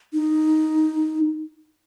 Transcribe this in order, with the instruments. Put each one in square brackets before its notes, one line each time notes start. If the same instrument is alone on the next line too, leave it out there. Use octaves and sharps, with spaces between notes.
[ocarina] D#4